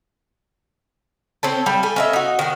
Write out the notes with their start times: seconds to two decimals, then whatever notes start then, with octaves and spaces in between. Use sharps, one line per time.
1.43 C4 C#4 A4
1.66 G3
1.83 A4 G#5
1.96 C#4 D#5 E5
2.13 D#4 F#4
2.39 D#3 F#4